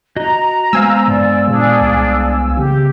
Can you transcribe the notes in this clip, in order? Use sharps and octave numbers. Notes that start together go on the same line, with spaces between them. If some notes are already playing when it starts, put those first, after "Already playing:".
F#4 D#5 A#5
G#3 B3 C5 F5 G#5 E6
G2 D5
A#2 D4 G#4 D5
C2
C#3 G4